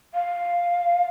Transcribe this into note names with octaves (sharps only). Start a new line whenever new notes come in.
F5